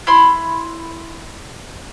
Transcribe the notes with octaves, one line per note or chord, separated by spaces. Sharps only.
E4 B5 C6